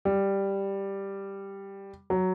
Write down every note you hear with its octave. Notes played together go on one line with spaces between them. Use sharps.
G3
F#3